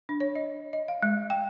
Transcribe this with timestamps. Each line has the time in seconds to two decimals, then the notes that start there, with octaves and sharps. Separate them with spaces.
0.09 D4
0.20 C#5
0.35 D#5
0.73 D#5
0.88 F5
1.02 G#3
1.30 G5